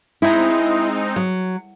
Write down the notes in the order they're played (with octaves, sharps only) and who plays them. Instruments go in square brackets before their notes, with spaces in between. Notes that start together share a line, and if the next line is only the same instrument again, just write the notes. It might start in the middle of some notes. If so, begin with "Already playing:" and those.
[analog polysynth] G#3 C4 D#4 [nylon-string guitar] E4
[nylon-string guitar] F#3